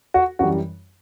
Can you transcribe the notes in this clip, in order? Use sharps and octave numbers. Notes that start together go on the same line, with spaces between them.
F#4
F#2 E3 G3 F#4